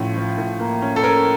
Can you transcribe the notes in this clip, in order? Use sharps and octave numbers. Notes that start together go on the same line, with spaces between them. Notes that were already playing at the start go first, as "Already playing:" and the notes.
Already playing: A2 F3 C#4
F3
A2
A#3
C#4
A4
C#4 A#4